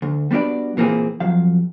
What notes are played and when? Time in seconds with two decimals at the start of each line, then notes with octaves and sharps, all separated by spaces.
0.02 D2
0.31 G3 B3 D4 F#4 D5
0.77 A#2 E3 A#3 C4 G#4
1.20 F2 F#3 F5